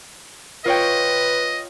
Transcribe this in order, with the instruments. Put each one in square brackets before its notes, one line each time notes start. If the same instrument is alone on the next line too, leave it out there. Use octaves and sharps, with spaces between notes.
[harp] F4 C#5 G5 [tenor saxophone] B4 [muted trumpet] D#5